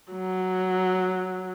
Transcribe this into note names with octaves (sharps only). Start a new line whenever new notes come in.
F#3